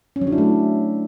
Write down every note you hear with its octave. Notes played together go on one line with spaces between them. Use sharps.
C#4
F#3
D4
E4
A3